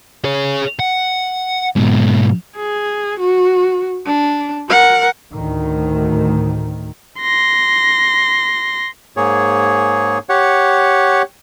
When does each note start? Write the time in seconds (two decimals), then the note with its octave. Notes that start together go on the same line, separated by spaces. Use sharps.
0.24 G#4 C#5
0.79 F#5
1.76 G#2 B2
2.56 G#4
3.20 F#4
4.06 D4
4.70 A#4 F#5
5.32 D2 A2 D#3
7.21 C6 A#6
9.17 G#2 A#3 G#4 C#5
10.29 G4 C#5 F#5